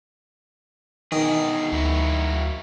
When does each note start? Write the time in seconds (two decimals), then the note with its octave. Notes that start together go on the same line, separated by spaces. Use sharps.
1.12 B2 D#3 G#4
1.72 D2 F#3 E4 F#4